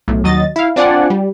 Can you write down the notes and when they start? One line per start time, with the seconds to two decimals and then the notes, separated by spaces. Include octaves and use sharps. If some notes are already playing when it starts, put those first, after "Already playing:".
0.08 B1 A2
0.24 D#2 F#3 D#5 A6
0.56 E4 F5
0.76 C4 D4 F4 D5 F#5 G#5
1.10 G3